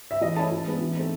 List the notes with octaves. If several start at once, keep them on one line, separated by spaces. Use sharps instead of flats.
E5
E3 D#5
A3 C#4 E4 A5
E3
G#3 B3 D4
E3
A3 C4 D#4